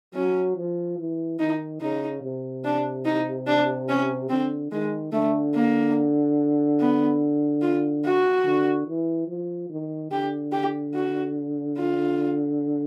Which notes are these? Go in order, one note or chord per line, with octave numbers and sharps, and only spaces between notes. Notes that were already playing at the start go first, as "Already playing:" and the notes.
F#3 C#4
F3
E3
D#3 D#4
C#3 D#4
C3
D4
D#4
D4
C#4
D3 C4
D#3 G#3
D3 A3
A#3
B3
F4
F#4
D3
E3
F3
D#3
D3 G4
G4
F#4
F4